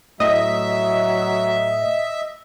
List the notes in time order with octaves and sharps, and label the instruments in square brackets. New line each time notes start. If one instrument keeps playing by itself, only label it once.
[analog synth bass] A2 [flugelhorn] F#3 [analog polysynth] D#5 [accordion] E5